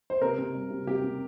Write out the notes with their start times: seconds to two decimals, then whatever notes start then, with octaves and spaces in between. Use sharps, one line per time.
0.10 C5
0.21 C3 A#4
0.38 C3
0.54 G3
0.71 C3
0.87 C3 G4
1.04 C3